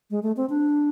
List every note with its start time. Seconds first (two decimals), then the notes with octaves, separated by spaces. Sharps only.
0.10 G#3
0.23 A3
0.37 C4
0.50 D4